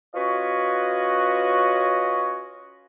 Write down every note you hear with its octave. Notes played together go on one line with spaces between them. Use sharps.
C#4 F4 F#4 B4 C#5 D#5